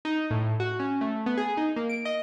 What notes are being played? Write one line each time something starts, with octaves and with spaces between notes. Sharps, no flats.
D#4
A2
F#4
C#4
A3
B3
G#4
D#4
A#3
D7
D#5